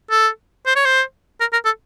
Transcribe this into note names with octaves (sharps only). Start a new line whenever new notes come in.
A4
C5
C#5
C5
A#4
A#4
A4